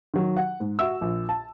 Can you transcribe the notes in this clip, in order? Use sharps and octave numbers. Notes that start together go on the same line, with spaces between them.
D#3 F#3
F#5
G#2
F#4 E5 E6
A#1
A5